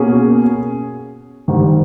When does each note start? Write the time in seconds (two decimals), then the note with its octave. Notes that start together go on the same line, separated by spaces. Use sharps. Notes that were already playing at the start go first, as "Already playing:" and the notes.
Already playing: B2 A#3 C#4 G#4
1.48 G#2 D#3 G3